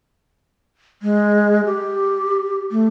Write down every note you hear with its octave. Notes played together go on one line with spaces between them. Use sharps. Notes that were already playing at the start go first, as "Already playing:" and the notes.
G#3
G4
A3